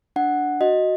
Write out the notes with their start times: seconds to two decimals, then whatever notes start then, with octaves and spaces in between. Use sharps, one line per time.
0.16 D4 F#5
0.61 F#4 D#5